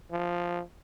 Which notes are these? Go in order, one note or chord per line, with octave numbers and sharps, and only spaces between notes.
F3